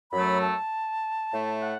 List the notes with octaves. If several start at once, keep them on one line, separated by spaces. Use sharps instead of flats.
F#2 F#3 A3 B5
A5
A2 A3
F#5